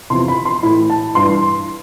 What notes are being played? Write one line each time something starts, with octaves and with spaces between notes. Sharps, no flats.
E2 C3 F3 C6
B5
C6
A2 E3 B5
A5
G2 E3 C6